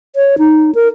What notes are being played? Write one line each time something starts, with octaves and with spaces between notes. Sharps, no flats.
C#5
D#4
A#4